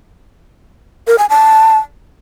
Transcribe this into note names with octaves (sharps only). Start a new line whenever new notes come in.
A#4
G#5
A5